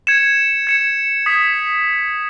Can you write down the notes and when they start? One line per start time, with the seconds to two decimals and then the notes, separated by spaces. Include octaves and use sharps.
0.07 G#6 C#7 E7
0.67 G#6 C#7 E7
1.26 D#6 G#6 B6